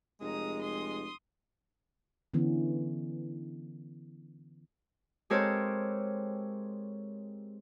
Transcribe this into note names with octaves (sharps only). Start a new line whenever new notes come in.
F1 G#3 A#5 D#6
C6 D#6
D3 E3 B3 C#4
G#3 C4 G4 A4 A#4 C#5